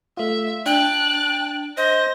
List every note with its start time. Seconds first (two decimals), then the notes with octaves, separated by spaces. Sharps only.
0.17 A3 F4 E5
0.66 D4 G5 A5 F#6
1.77 C5 D#5 A#6